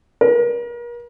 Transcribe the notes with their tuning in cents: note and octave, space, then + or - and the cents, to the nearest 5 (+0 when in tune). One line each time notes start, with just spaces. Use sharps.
A#4 +40